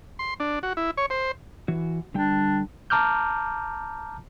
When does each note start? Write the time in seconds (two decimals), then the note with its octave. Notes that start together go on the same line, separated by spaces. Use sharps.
0.19 C6
0.40 D4
0.63 F#4
0.77 E4
0.97 C#5
1.10 C5
1.68 E3 F#4
2.14 D3 G3 D4 G5
2.90 A5 A#5 D6 F6 G6